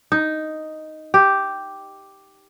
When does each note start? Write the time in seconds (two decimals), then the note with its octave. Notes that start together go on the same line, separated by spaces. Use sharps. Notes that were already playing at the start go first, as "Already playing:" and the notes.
0.12 D#4
1.14 G4